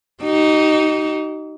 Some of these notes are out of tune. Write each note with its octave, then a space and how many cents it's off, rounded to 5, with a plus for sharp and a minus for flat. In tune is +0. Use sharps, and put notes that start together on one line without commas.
D#4 +0 G4 -45